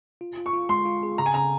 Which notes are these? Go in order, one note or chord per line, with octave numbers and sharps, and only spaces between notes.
F4
F4
C#6
F4
G#3 C6
F4
G#4
C#3 A#5
G#5
C#3 A#5